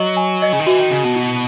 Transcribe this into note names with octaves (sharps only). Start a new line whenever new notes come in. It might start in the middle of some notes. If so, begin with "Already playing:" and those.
Already playing: F#3 D#5
G#5
D#5
C#3
D#3
E3 F#4
D#3
C#3 D#5
B2
E4